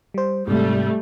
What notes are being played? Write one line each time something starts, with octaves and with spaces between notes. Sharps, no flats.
G3 C5
G#2 C3 G3 A3